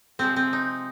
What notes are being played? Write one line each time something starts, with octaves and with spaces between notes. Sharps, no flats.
C3 F3 G#3 C4
C4
D#4